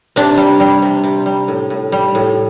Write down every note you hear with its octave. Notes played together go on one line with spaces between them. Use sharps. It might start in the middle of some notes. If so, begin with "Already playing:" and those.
C3 D4
G3
G3
C3
C3
G3
A2
A2
G3
A2